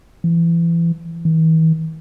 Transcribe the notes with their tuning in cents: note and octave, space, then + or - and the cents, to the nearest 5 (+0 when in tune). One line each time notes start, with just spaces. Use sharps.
E3 +30
E3 -45